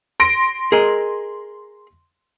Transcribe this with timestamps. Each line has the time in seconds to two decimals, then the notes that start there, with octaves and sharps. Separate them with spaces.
0.20 C6 A#6 D7
0.72 G#4 A#4 D#5